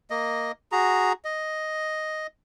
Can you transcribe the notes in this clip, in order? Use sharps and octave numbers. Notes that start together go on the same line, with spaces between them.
A#3 D#5
F#4 G#4 A#5
D#5